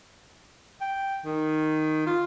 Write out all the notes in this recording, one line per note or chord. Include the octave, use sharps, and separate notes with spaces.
G5
D#3
F4